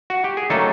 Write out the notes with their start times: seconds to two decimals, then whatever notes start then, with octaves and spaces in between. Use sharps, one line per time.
0.10 F#4
0.24 G4
0.37 G#4
0.50 D#3 F#3 A3 A#3 C#4 A4